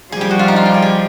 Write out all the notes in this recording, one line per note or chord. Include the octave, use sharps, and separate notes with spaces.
F3 G3 G#4
G4
F#4
F4
D#4
F4
G4
G#4
G4